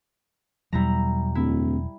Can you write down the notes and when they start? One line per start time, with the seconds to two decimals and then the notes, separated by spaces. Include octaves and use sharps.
0.73 E2 B2 F#3 G3 E4 A#5
1.35 D1 E4